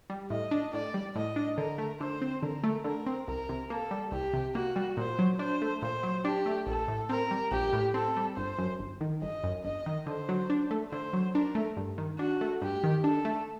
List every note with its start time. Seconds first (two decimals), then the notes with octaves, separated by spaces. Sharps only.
0.10 G3
0.30 A2 D#5
0.51 D4
0.73 A2 D5
0.94 G3
1.16 A2 D#5
1.36 D4
1.57 D3 A#4
1.78 A3
2.00 D3 C5
2.22 C4
2.42 D3 A#4
2.64 A3
2.84 D3 A#4
3.07 C4
3.28 C2 A#4
3.49 C3
3.70 A#3 A4
3.91 G3
4.12 C2 G4
4.34 C3
4.55 A#3 F#4
4.76 G3
4.97 A#2 C5
5.19 F#3
5.39 D4 C5
5.62 A3
5.82 A#2 C5
6.03 F#3
6.25 D4 G4
6.46 A3
6.67 A#1 A4
6.88 A2
7.09 C4 A#4
7.31 G3
7.52 A#1 G4
7.73 A2
7.94 C4 A4
8.16 G3
8.37 G1 C5
8.59 F#2
8.79 G1
9.01 D#3
9.22 G1 D#5
9.44 F#2
9.64 G1 D#5
9.86 D#3
10.06 D3 C5
10.29 F#3
10.50 D4
10.71 A3
10.91 D3 C5
11.13 F#3
11.34 D4 A#4
11.55 A3
11.77 G2
11.98 D#3
12.19 D4 F#4
12.41 A3
12.62 G2 G4
12.84 D#3
13.04 D4 A4
13.25 A3